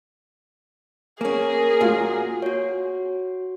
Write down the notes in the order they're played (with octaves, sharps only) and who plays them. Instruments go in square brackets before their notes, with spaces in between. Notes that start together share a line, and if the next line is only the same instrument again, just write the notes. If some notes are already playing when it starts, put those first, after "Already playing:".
[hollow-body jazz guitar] A#3 C#4 [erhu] G#4 [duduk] A#4
[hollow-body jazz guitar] A#2 F5 [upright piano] A#3 F4 F#4
[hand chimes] F#4 C#5